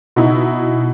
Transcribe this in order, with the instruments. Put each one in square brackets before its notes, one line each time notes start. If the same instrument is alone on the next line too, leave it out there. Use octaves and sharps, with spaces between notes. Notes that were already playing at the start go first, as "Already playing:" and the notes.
[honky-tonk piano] B2 D#4 E4